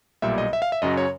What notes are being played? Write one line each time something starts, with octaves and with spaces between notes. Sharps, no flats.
B1 A#2 G3 E5
D#5
E5
F5
E5
F#2 C#3 F#3 D#5
C#5